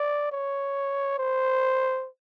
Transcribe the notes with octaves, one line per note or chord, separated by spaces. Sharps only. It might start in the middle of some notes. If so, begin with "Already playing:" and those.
Already playing: D5
C#5
C5